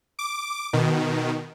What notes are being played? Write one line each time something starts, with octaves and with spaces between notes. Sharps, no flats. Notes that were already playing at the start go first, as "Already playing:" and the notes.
D6
B2 D#3